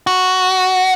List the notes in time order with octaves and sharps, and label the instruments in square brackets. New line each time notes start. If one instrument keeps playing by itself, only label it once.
[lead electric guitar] F#4